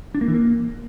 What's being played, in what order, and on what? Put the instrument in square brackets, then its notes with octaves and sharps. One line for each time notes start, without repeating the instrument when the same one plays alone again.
[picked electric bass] D4
A#3
E3
A#3